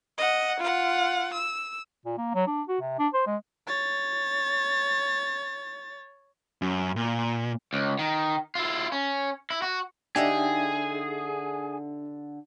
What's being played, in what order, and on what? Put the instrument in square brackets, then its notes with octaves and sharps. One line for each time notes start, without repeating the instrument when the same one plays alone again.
[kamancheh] D#5 F#5
F4 F#5
E6
[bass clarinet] A#2
A#3
F#3
D4
F#4
C3
D4
C5
G#3
[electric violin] C#5 A6
[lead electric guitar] F#2
A#2
[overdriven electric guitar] C#2
D#3
E4 F4
C#4
E4
F#4
[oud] D3 D#4 G4 [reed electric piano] D4 E5 [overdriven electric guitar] G#4